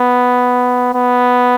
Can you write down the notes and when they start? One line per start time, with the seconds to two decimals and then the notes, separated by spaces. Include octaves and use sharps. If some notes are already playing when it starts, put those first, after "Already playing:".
Already playing: B3
0.94 B3